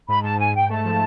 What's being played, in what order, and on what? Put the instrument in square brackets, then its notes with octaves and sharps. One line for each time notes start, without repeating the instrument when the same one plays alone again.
[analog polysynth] G#2 [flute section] B5
[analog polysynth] G#2 [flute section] A5
[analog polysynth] G#2 [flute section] G#5
[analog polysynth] G#2 [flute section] G5
[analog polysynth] A3 [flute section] A5
[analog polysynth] F3